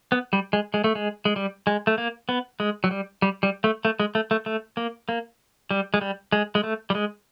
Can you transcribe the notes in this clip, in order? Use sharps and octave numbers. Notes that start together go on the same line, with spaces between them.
B3
G3
G#3
G#3
A3
G#3
G#3
G3
G#3
A3
A#3
B3
G#3
F#3
G3
G3
G3
A3
A3
G#3
A3
A3
A3
A#3
A#3
G3
G#3
G3
G#3
G#3
A3
G3
G#3